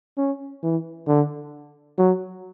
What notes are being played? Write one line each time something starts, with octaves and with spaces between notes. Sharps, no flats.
C#4
E3
D3
F#3